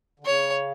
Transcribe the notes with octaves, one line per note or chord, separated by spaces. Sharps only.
D3
C#3 C#5